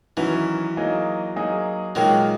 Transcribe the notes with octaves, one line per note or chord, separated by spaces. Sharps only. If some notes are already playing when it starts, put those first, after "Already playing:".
D#3 E3 F#3 C#4 F#4 B4
F#3 A#3 D#4 G#4 D#5
F#3 A#3 D#4 G#4 D#5
A#2 D#3 F#3 G#3 D#4